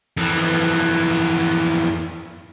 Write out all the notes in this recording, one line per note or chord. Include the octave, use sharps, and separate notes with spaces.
F2 E3